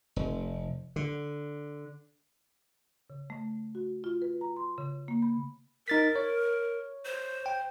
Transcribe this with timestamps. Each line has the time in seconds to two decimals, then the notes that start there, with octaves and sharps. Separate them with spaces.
0.16 F1
0.96 D3
3.10 C#3
3.30 A3
3.75 F#4
4.04 F4
4.22 B4
4.41 A#5
4.56 C6
4.78 C#3
5.08 A#3
5.22 B5
5.88 D#4 A#4 A6 B6
6.16 C#5
7.06 C5
7.46 G5